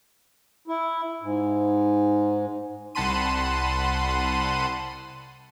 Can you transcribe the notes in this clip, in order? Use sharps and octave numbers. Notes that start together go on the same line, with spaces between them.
E4
G#2
C2 F#5 A5 B5 C6 D#7